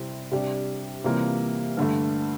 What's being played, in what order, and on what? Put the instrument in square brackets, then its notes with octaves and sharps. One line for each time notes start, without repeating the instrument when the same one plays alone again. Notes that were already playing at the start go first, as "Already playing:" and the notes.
Already playing: [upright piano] C3 G3 C4 E4
C3 G3 D4 G4
C3 E3 G3 A#3 F4
G2 D3 A3